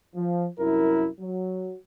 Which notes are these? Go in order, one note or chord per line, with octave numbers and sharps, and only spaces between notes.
F3
C2 F#2 E4 A#4
F#3